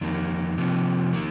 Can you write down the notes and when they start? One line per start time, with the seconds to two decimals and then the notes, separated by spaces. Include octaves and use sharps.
0.01 F2 D#3 A#3
0.58 C3 F3 A#3
1.13 D#3 A#3